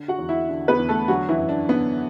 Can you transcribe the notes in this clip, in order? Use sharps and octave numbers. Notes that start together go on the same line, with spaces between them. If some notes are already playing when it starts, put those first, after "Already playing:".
Already playing: D3
F#4 F#5
E2
E4 E5
D3
B3 B4
E2
A3 A4
D3 F#3 F#4
E3 E4
F#2
D4
D3 B3